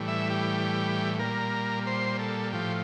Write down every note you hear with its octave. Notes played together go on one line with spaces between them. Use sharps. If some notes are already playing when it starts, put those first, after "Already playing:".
Already playing: A2 E3 G3
E5
G4
A#2 G3 A#4
C5
A4
A2 F3 G4